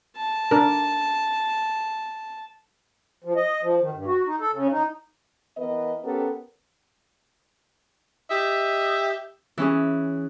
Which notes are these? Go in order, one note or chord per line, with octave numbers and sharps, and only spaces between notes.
A5
D4 A#4
F3
D#5
F3
D#3
G2
F#4
D#4
A4
C#3
D#4
E3 B3 A#4 B4 D#5
B3 C#4 G4 A4 A#4
G4 D#5 E5
E3 C#4 G#4